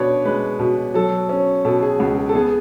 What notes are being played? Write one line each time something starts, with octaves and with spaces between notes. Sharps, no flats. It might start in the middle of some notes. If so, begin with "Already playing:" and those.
Already playing: B2 D4 B4 C#5 D5
G#3 B4
B2
F#3 A4
C#4
B2 A4
G#4
C#2 F#4
G#4
A4
B3 G#4